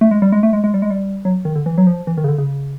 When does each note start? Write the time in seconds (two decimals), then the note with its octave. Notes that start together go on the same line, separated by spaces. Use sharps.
0.01 A3
0.11 G#3
0.22 G3
0.32 G#3
0.43 A3
0.53 G#3
0.64 G#3
0.74 G3
0.82 G#3
0.90 G3
1.25 F#3
1.45 D#3
1.55 D3
1.66 E3
1.78 F#3
1.87 F3
2.07 E3
2.18 D#3
2.24 C#3
2.28 D3
2.38 C#3